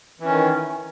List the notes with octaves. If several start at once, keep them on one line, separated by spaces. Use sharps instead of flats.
D#3 E3 C#4